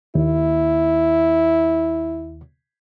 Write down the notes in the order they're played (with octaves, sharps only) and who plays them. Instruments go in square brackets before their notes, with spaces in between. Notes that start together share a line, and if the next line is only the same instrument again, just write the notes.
[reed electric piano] D#2 [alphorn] E4